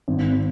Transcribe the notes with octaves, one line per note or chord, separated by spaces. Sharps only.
G#1